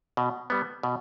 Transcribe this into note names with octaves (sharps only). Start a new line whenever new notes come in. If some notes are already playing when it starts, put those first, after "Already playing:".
B2
G3 B3
B2